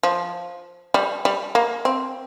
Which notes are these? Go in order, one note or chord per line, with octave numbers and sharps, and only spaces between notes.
F3
G3
G3
A#3
C4